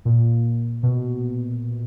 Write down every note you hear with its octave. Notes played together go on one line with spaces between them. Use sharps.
A#2
B2